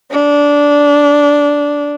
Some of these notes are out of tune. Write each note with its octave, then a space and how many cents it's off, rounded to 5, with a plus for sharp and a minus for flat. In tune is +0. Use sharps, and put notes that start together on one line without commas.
D4 -15